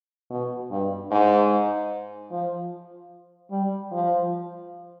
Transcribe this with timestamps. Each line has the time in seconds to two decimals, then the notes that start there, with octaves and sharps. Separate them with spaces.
0.31 B2
0.71 G2
1.11 G#2
2.31 F3
3.51 G3
3.92 F3